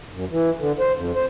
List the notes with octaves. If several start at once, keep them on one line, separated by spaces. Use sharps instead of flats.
F#2
E3
D3
C5
F2
C5